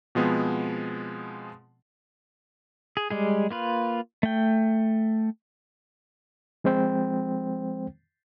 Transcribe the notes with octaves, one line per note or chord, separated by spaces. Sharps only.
B2 F3 G#3 B3 C4
G#4
G3 G#3 G#4
A#3 F4 B4
A3 G5
F3 G#3 C4 C5 G5